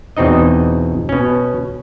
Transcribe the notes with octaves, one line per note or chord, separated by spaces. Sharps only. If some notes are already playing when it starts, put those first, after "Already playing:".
E2 B2 C4 D#4 D#5
B2 C#4